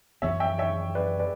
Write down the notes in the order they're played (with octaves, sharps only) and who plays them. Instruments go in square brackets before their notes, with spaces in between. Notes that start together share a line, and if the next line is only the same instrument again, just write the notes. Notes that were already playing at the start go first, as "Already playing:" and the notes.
[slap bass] F#2 E3 B3 D4 [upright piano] C#5 E5
[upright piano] E5 G5
C#5 E5
B4 D5
B4 D5